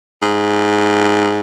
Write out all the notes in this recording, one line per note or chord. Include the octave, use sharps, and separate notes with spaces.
G#2